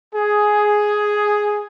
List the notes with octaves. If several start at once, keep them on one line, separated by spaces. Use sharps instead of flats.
G#4